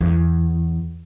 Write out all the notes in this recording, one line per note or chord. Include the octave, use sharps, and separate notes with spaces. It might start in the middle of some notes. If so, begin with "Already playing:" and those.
E2